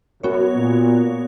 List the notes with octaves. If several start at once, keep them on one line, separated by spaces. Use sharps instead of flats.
F#2 B3 F#4 C#5
A#2